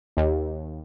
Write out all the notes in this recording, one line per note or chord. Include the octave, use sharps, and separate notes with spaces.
D#2